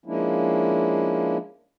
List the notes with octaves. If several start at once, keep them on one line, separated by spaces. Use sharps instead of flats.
F3 G#3 A#3 C#4 D4 E4